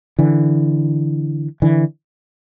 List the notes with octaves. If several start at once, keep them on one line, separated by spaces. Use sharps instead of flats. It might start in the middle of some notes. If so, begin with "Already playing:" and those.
D3 E3
D3 E3